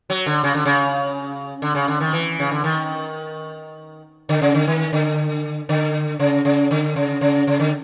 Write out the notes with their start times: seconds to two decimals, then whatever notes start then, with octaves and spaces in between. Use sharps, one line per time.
0.10 F#3
0.26 D3
0.43 C#3
0.54 D3
0.65 C#3
1.62 D3
1.75 C#3
1.88 D3
2.00 D#3
2.13 E3
2.39 C#3
2.51 D3
2.64 D#3
4.29 D3
4.42 C#3
4.54 D3
4.67 D#3
4.93 D3
5.69 D3
6.19 C#3
6.45 C#3
6.71 D3
6.96 C#3
7.21 C#3
7.47 C#3
7.59 D3